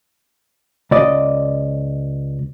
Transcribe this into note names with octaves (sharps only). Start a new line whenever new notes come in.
C#2 D5 D#5